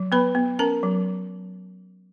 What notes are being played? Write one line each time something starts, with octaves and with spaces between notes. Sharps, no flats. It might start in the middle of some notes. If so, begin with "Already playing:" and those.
Already playing: F#3
B3 B4 B5
B3
C#4 A#4 A#5
F#3